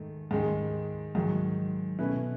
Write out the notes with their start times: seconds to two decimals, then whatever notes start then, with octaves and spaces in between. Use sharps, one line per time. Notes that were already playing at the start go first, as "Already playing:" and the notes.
Already playing: G#2 D#3 A3
0.31 G#2 D#3 G#3
1.15 G#2 D#3 F#3
1.99 B2 A3 C#4 E4 B4